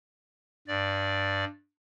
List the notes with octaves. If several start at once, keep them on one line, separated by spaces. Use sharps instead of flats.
G2 D5